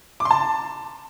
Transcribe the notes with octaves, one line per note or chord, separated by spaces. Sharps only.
D6
C6
A5